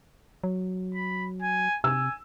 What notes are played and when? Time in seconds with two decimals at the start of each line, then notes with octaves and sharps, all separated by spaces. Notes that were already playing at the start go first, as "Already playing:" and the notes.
0.44 F#3
0.94 B5
1.42 G#5
1.84 C3 G#5 E6